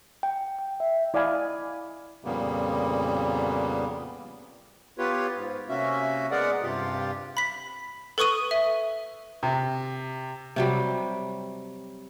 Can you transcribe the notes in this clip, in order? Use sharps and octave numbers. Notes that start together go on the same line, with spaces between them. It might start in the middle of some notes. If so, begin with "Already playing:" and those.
G5
G5
E5
E4 D5 D#5 F5 G#5 B5
F2 A#2 C#3 G3 A#3 B3
B3 F4 G4 B4 C#5
G#2
C3 A#3 C#4 F#4 E5
G#3 B3 G#4 A#4 D5 F#5
G2 C3 F4 G4
B5 B6
A4 B4 C#6 D#6 D#7
E5
C3
C3 F#3 G3